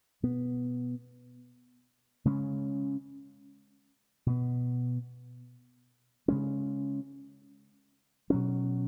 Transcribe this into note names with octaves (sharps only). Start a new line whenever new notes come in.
B2 B3
C#3 G#3 C#4
B2 B3
C#3 G#3 C#4
B2 F#3 C#4